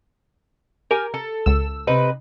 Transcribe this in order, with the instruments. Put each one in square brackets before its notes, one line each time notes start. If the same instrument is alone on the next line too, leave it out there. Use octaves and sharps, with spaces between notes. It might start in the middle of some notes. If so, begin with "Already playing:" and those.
[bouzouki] G4 G#5 [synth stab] A#4
[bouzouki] A4
[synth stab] C#2 E6
[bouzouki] C3 D#4 B4